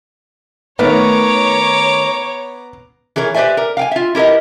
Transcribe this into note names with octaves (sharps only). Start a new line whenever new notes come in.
D#3 A3 B3 C#5 A#5 D6
E3 G#4 A#4 C#5
G4 B4 C5 D5 E5 G#5
A#4
F5 G5 G#5
F4 E5
E4 G4 A#4 B4 D#5